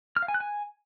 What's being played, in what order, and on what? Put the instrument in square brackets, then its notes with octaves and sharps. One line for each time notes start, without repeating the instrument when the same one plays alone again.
[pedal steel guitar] F6
F5
G#5
F#6
G#5